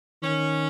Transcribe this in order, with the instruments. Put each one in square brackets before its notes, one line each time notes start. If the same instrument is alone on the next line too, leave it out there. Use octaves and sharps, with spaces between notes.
[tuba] D#3 [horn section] C#4